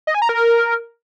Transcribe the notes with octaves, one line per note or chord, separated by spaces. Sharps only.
D#5
G#5
A#5
A#4